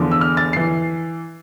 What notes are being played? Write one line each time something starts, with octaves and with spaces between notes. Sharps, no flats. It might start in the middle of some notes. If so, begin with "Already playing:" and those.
Already playing: E2 D3 F3
E6
F6
A6
C7
E3